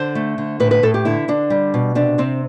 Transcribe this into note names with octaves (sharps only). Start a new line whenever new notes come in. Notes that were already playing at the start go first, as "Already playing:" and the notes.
Already playing: D3 C5
A3
D3
A2 B4
B4
A2 A4
G4
D3 E4
D3 D4
G3
B2
C3 D4
C3 C4